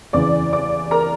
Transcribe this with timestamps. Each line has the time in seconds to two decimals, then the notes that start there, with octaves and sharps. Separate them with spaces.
0.13 E2 C#3 E3 D5 D6
0.53 D5 D6
0.91 A#4 A#5